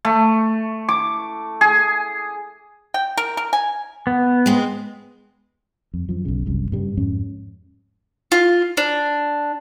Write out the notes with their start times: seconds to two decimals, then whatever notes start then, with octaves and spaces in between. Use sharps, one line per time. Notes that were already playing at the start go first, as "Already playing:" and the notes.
0.05 A3
0.89 D6
1.61 G#4
2.94 G5
3.17 A#4
3.37 A#4
3.53 G#5
4.07 B3
4.46 G#3 C4
5.94 F2
6.09 F#2 F3
6.25 B1 C#3
6.46 F#1 C2 F#2
6.72 G2 C#3 G3
6.97 F2 G#2 C#4
8.32 F4
8.77 D4